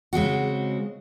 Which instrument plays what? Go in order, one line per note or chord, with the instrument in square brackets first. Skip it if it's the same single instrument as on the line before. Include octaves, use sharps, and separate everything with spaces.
[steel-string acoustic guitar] C#3 G#3 C4 F#4